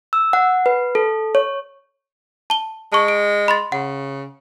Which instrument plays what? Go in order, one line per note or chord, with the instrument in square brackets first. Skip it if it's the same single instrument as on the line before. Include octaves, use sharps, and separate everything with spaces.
[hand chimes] E6
F#5
B4
A4
C#5
[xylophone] A5 G7
[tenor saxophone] G#3 [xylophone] A5 C#6
[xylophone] D7
B5 C6 A6
[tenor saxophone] C#3 [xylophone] F#5